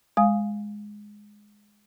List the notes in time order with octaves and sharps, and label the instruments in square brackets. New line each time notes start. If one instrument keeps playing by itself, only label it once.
[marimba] G#3 F5 G#5 D#6